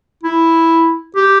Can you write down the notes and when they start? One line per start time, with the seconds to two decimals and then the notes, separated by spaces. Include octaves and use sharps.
0.23 E4
1.16 G4